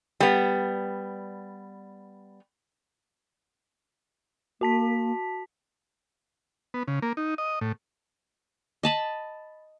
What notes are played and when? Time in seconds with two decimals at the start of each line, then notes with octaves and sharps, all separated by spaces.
0.20 G3 B3
4.61 A#3 F#4 A5 B6
6.74 B3
6.88 C#3
7.02 A#3
7.17 D#4
7.38 D#5
7.61 A2
8.83 D#5 A5 B5